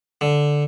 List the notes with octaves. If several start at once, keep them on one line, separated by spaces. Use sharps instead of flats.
D3